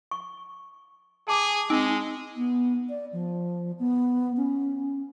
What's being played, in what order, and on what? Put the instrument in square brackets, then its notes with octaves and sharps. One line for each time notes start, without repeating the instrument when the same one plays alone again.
[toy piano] C#6
[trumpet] G#4 [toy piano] A5 D6
[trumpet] G#3 [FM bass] C4 [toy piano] D#4
[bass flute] B3
D5
F3
B3
C#4